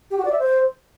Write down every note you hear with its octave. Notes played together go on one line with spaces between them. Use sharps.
G4
F#4
D5
E5
C5